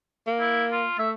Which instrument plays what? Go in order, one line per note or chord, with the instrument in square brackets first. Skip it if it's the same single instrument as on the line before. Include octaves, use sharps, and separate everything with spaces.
[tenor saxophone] A#3
[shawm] E4
F4
[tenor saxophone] A3 [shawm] E5